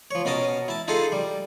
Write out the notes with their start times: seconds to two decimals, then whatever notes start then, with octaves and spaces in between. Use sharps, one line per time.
0.11 F3 C#5
0.25 B2 C#4 A#4 A5 D#6
0.68 E4 A5
0.88 D#4 F4 G#4 A4 A5
1.12 G3